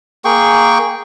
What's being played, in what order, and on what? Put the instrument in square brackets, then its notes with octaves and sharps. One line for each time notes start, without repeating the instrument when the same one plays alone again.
[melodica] A#3 G#4 G5 C#6